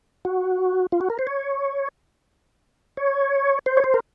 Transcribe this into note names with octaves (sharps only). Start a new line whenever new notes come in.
F#4
F4
F#4
A#4
C5
C#5
C#5
C5
C#5
C5
A#4